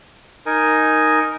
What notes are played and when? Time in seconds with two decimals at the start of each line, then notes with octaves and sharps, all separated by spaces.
0.46 D#4 A#4 G#5